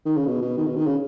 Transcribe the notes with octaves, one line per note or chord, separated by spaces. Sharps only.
D#3
C#3
B2
B2
D#3
B2
D#3
C#3